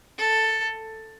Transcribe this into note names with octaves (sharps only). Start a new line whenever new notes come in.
A4